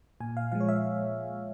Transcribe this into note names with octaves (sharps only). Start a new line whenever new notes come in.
A#2 G#5
F5
F3 G#3 F5
C#5
E5